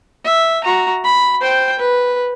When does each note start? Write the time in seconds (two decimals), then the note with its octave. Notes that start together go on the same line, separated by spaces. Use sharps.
0.25 E5
0.64 F#4 A#5
1.04 B5
1.41 C5 G5
1.79 B4